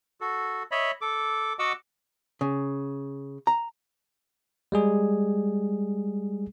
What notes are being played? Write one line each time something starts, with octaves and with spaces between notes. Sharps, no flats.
F#4 A4
C#5 D#5 E5 B5
A4 D6
F#4 D#5 F#5 D6 E6
C#3
A#5
G3 G#3 G#4